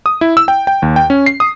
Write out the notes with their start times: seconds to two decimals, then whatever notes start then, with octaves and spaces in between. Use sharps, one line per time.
0.06 D#6
0.21 E4
0.37 E6
0.48 G5
0.67 G5
0.82 D#2
0.96 G5
1.10 C#4
1.26 C7
1.40 D#6